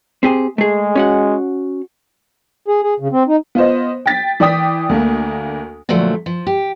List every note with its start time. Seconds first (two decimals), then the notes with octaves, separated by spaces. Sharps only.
0.23 C4 G4 G#4
0.58 G#3 A3 G#4
0.95 C#4 F#4 F#5
2.68 G#4
2.82 G#4
3.00 C#3
3.12 C4
3.28 D#4
3.55 B3 F4 C5 D#5
4.06 G5 A6 B6
4.40 E3 D5 G5 D#6 B6
4.89 D2 A3 A#3
5.89 A#2 D3 F3 F#3 A3
6.26 F3
6.47 G4